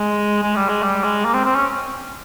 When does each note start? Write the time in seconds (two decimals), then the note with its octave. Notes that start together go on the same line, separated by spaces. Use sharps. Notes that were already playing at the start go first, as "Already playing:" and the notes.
Already playing: G#3
0.42 G#3
0.56 G3
0.69 G#3
0.83 G3
1.04 G#3
1.25 A#3
1.34 C4
1.45 C4
1.55 C#4